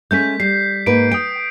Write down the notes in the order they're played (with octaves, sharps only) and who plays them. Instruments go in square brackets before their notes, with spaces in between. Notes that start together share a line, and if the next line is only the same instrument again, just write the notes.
[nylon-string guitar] G#3 A3 C#4 [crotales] G6 B6
[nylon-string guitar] G3 [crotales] C7
[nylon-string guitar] G#2 A#3 B4 [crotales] D7
[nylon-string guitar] G5 [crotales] D#6 D7